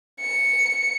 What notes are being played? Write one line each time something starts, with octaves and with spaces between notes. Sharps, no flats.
C#7